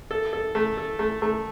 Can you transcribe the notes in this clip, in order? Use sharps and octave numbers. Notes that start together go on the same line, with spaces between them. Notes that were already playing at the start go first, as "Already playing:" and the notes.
A4
A4
A3
A4
A3
A3